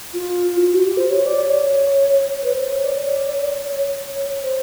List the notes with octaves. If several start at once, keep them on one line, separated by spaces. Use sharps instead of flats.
F4
F4
F#4
G4
C5
C#5
D5
C#5
B4
C5
C#5
D5
C#5
D5
C#5
C5